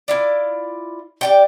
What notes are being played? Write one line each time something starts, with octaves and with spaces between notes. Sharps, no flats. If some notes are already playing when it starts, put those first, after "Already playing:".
E4 F4 D5
G4 D5 G5